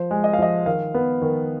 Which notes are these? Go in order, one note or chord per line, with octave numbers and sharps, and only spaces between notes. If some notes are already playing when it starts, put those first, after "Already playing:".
Already playing: F3 C5
G#3
D#5
F5
F3 D#5
D#3 F5
B3
D#3